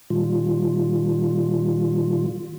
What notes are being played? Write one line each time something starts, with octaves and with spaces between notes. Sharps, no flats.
A#2 D#3 G3 F4